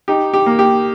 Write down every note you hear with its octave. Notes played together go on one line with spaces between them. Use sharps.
D#4 G4
G4
A#3
G4